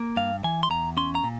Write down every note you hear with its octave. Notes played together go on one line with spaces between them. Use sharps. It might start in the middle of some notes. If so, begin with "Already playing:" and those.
Already playing: A#3
G2 F5
E3 G#5
C6
E2 A#5
C#4 C6
A#5
A#2